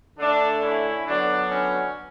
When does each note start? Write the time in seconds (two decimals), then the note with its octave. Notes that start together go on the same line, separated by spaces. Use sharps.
0.19 D3 A3 D4
0.63 C#4 E4
1.06 D3 F#3 B3 D4
1.50 C#4